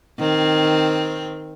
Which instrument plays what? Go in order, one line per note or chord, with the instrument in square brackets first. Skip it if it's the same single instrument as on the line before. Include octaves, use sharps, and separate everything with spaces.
[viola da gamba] D#3 C4